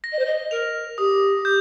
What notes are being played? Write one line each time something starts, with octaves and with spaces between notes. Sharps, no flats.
A#6
D#5
C5
D#5
A#4 F7
G4 D#6
G6